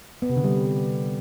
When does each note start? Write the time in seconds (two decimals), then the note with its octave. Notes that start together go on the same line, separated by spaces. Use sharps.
0.22 B3
0.29 C3
0.37 D3
0.44 G3